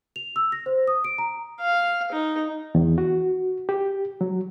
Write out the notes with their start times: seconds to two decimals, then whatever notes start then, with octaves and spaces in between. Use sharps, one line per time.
0.16 F7
0.36 E6
0.52 A#6
0.66 C5
0.88 D#6
1.04 D7
1.18 A#5
1.60 F5
2.12 D#4
2.75 E2
2.98 F#4
3.69 G4
4.21 F#3